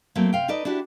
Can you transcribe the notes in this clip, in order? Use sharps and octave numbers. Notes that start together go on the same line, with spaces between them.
F#3 A3 A#3 C4
C3 F5 G5
D#4 A4 B4 D5 D#5
D4 E4 F#4 G4